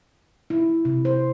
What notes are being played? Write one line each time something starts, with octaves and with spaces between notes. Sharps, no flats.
E4
C3
C5